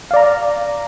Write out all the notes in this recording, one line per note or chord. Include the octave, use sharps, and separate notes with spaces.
D5 F5 A#5